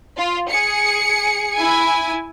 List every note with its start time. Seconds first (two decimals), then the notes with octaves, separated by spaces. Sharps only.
0.17 F4
0.49 G#4 C#7
1.55 E4 G#5